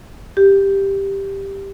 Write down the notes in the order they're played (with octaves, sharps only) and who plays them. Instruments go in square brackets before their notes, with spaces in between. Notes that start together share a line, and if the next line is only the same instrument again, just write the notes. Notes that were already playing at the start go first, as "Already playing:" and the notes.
[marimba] G4